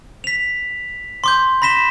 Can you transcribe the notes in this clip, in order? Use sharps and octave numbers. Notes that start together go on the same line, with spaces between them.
B6 F7
C6 D6 G6
B5 A#6 B6 E7 G7